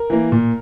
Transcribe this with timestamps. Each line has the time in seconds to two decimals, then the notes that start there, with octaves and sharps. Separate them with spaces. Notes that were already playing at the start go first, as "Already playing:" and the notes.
Already playing: A#4
0.10 E3 A#3
0.32 A#2